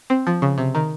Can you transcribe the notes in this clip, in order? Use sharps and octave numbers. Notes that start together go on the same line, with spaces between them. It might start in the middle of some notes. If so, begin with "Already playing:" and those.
C4
F3
C#3
C3
D#3